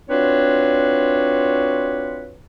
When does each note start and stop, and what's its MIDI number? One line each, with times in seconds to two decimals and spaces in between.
0.09 2.37 60
0.09 2.37 62
0.09 2.37 65
0.09 2.37 66
0.09 2.37 71
0.09 2.37 73